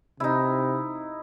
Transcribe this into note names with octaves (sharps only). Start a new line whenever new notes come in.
C3 D#4 E4